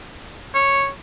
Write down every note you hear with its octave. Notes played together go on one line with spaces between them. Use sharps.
C#5